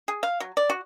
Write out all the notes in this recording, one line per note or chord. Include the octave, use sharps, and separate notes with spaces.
G#4
F5
F#3
D5
F#4